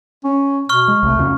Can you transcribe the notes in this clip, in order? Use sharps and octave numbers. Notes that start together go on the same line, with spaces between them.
C#4
B2 C#6 F6
G#3
C2 A3
F2 C#3 C#4